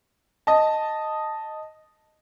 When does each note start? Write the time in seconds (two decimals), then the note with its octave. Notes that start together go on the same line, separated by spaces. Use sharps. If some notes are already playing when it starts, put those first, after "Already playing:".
0.47 D#5 A5